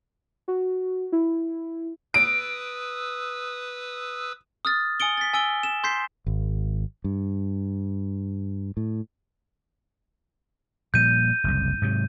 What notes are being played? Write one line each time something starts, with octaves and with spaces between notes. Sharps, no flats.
F#4
E4
B4 D#6 E6 D7
D#6 F6 A6
G#5 D#6 C#7 D7 G7
A6 B6
G#5 E6 D7 G7
E7
C6 G6 B6 C7
G#1
G2
A2
A#2 F3 G3 G6 D#7
F#1 C2
G#2 C3 F#3